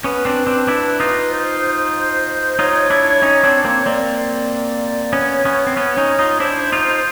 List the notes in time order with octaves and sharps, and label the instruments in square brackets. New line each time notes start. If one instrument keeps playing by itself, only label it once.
[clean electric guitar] B3 C#4 [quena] B4
[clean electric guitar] C4 D4
C4 D4
D4 E4
D#4 F4
[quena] C5
[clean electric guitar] D#4 F4 [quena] C#5
[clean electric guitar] D4 E4
C#4 D#4
C4 D4
A#3 C4
[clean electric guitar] A#3 C4 [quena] D5
[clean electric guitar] B3 C#4 [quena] C#5
[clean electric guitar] B3 C#4
C4
B3 C#4
C#4 D#4
D#4 F4
[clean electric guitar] D4 E4 [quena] C5
[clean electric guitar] D#4 F4